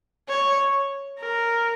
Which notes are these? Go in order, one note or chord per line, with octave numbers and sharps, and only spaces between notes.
C#5
A#4